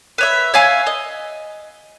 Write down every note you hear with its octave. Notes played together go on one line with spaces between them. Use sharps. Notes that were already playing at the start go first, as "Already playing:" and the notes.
B4 C#5 E5
C#5 E5 F5 G#5
D#5